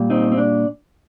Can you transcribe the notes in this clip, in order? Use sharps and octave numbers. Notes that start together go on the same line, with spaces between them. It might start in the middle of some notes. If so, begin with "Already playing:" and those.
Already playing: A#2 G3
C4 D#4
C4
D4